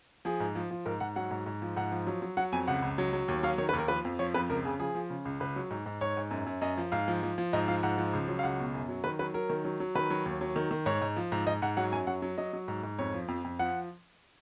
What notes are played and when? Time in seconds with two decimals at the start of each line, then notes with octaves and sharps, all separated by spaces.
0.25 F3 G#4
0.40 G#2
0.55 F3
0.71 F3
0.86 G#2 A#4
1.00 G#2 F#5
1.16 F#3 F#5
1.31 G#2
1.46 G#2
1.62 F3
1.76 G#2 F#5
1.92 F3
2.07 F#3
2.22 F#3
2.37 F#3 F#5
2.52 F2 G#5
2.68 C#2 F#5
2.82 C#2
2.98 F#3
3.13 F#3
3.28 D#2
3.43 F#3 F5
3.58 D#3 C#5
3.69 B4
3.73 D#2 A#4
3.88 F3 B4
4.05 F2
4.19 F3 C#5
4.34 F2 B4
4.49 C#2 A#4
4.65 C#3 G#4
4.79 F3 G#4
4.95 F3
5.10 C#3
5.25 C#2
5.40 C#2 B4
5.56 F#3
5.71 G#2
5.86 G#2
6.01 G#2 C#5
6.17 G#2
6.31 F#2
6.46 F#2
6.62 F#2 D#5
6.77 F3
6.92 G#2 F5
7.08 F3
7.23 F3
7.38 F3
7.53 G#2 D#5
7.68 F3 F5
7.83 G#2 F#5
7.98 F3
8.13 C#2
8.28 F#3
8.39 F5
8.43 C#2 F#5
8.59 B2
8.74 F#2
8.89 F#3
9.04 D#3 B4
9.19 F#3 B4
9.34 F#3 A#4
9.50 D#3
9.65 F#3
9.80 F#3
9.95 D#3 B4
10.10 F#3
10.26 D#2
10.41 F#3
10.56 D#3
10.71 D#3
10.86 G#2 C#5
11.02 G#2
11.16 F3
11.32 G#2
11.46 G#2 D#5
11.62 G#2 F#5
11.77 F#3 F#5
11.92 F#2 G#5
12.07 F#3 F#5
12.22 F#3
12.38 F#3 D#5
12.53 F#3
12.68 G#2
12.83 G#2
12.99 F2 C#5
13.14 F3
13.28 F2
13.44 F2
13.59 F3 F#5